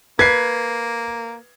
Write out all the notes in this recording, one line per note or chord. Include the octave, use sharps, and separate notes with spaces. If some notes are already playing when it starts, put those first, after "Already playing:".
A#3 B4 G#6 C7